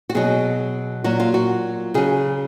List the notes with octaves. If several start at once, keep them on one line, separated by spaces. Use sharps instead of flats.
F#4
B2 F#3 G#4
A#2 F#3 F#4
F4
F#4
C#3 F#3 G#4